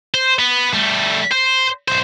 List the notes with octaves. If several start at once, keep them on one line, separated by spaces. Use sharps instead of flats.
C5
B3
G3 A3
C5
B1 C5